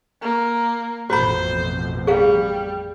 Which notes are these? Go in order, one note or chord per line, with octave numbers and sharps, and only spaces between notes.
A#3
A1 F2 B2 F#4 C5 B5
G3 G#4 F5